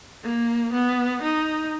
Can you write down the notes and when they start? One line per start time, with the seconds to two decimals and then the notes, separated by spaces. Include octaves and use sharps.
0.23 A#3
0.73 B3
1.23 D#4